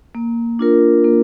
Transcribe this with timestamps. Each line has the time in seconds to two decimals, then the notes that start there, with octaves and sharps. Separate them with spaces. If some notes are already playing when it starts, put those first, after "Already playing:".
0.15 A#3
0.59 D4 F4 A#4
1.04 A#3